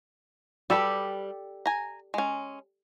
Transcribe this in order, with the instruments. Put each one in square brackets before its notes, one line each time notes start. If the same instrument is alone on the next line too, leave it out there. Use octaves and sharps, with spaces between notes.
[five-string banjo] G3 B4 [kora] G4 A4 D5
[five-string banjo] G#5 A#5
G#3 C#4